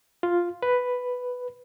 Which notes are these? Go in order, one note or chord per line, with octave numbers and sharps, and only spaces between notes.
F4
B4